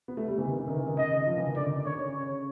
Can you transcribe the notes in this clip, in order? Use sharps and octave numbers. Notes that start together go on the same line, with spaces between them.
B3
A3
G3
E3
D#3
E3
D#3
E3
D#3
C#3 D#5
D#3
F3
E3
D#3
D3 D5
D#3
D3
D#3 C#5
D3
C#3
C#5